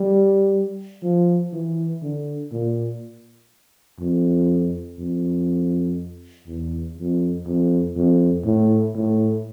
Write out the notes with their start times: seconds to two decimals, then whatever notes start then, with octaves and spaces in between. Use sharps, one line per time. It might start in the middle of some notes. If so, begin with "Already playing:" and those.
Already playing: G3
1.03 F3
1.53 E3
2.02 D3
2.52 A#2
4.00 F2
4.99 F2
6.47 E2
6.97 F2
7.46 F2
7.96 F2
8.45 A2
8.95 A2